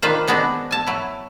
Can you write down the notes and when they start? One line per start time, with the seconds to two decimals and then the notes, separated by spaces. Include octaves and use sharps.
0.02 D#3 D4 F4 B4 C5
0.27 G#3 B3 C4 D4 F#4
0.71 G#5 A5
0.87 F#3 E4